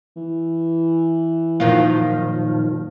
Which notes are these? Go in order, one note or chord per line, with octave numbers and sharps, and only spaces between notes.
E3
F#2 A#2 D#3 F3 F4